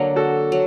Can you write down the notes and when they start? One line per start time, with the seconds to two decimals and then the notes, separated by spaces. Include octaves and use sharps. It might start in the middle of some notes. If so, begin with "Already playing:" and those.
Already playing: D3 F#3 A#3
0.16 F#4 A4
0.52 F#3